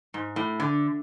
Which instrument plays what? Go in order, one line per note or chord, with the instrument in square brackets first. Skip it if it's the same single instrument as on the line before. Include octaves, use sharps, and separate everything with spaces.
[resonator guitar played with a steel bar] G#2
A2
D3